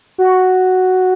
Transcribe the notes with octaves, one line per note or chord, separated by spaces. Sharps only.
F#4